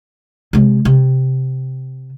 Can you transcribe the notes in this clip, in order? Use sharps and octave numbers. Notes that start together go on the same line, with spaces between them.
C3 G#3
C3